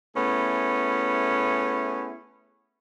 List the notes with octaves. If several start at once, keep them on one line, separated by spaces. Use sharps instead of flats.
A3 B3 C#4 E4 G#4